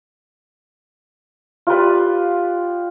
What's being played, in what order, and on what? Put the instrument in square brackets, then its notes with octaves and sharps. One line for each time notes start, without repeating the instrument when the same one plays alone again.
[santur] F4 G4 B4 D5